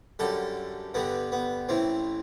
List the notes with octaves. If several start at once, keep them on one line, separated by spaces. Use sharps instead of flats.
F#2 D3 G3 A4
G2 D3 G3 B3
B3
A1 A2 E3 C4